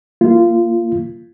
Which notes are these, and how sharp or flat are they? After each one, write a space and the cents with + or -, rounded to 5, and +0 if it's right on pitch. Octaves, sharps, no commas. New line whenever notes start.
A#3 -5 F4 -20